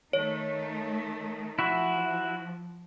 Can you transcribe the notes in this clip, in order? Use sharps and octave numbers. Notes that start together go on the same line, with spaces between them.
D#3 A3 C#5
F3 E4 F#4 E5